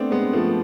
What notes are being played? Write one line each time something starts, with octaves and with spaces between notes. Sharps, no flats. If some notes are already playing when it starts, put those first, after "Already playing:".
Already playing: A3 B3 C4 D4
G#3 B3
F3 A3